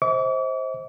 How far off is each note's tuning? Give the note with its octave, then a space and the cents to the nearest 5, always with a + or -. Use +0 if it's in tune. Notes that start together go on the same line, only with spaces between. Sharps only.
C5 +10 D#5 +45 D6 -45